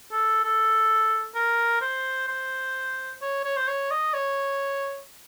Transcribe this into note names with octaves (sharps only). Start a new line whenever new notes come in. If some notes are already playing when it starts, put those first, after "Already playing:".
A4
A4
A#4
C5
C5
C#5
C#5
C5
C#5
D#5
C#5